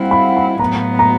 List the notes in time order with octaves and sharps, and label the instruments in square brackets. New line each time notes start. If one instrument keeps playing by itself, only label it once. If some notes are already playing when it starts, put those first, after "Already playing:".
Already playing: [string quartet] G3 C4 E4 [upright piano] F5 F#5
[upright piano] B5
B5
[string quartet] A2 F#3 B3 [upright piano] A#5
[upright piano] A#5